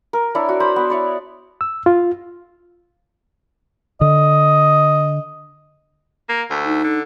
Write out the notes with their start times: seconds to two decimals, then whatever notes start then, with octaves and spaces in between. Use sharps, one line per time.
0.13 A#4
0.35 D4 E4 C#5
0.49 F#4
0.60 C5 B5 D6
0.76 B3
0.90 E4 C#5 D5
1.61 E6
1.86 F4
4.01 D3 D#5
6.29 A#3
6.50 D2
6.65 D#4
6.84 D3